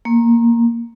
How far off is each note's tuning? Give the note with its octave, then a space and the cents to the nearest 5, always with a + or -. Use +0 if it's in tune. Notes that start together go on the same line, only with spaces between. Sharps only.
A#3 +0